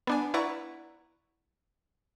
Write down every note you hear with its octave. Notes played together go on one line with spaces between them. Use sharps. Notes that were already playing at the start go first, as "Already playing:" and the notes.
B3 D4 G#5
E4 B4 D5 F#5 A#5 C#6